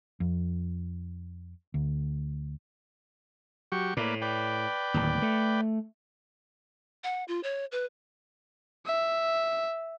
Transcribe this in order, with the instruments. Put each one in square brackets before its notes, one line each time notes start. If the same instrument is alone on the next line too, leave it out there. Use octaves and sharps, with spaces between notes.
[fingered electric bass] F2
D2
[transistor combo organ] F#3 G4 C#6
[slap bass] A2 [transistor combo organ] A#3 B4 D5
[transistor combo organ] B4 D5 G5
[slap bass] D1 D#2
A3
[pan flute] F#5
F4
C#5
B4
[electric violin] E5